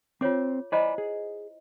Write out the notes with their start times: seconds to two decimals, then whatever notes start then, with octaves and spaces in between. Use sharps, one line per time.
0.21 C4 F4 C5 C#5 D6
0.72 E4 C5 D5 D#5 G#5 B5
0.98 G#4